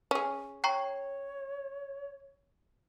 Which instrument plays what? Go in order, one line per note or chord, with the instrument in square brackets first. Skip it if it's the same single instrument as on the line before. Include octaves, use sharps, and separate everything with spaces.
[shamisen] C#4 G#4
[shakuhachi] C#5 [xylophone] G5 A#5 C#6